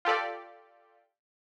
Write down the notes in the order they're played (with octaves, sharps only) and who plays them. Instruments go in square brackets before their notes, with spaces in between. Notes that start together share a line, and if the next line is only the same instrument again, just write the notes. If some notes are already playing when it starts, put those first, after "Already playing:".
[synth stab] F4 G4 A4 D5